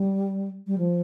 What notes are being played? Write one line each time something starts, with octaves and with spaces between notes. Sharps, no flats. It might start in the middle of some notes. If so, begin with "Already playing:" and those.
Already playing: G3
G3
F3